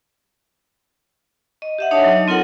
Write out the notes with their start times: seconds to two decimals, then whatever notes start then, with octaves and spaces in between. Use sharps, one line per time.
1.62 D#5
1.78 G4 E5 F#5
1.91 D4 D#4 C#5 D#5 A5
2.04 F#3 D#4
2.28 C4 F4 A4 A#4 F#5